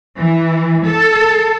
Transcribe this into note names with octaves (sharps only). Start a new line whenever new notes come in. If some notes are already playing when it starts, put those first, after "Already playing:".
E3
A4